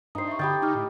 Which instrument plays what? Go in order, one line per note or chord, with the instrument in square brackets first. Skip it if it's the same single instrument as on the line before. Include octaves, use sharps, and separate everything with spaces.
[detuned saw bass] G2 [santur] D#4 C5 [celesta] D#6 C7
[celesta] E5 C#6
[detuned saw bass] D3 [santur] G4 G5 [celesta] B5 D#6 A6
[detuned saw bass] D#4 [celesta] D6 F6
[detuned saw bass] A2